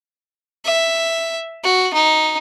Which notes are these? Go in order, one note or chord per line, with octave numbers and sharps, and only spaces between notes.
E5
F#4
D#4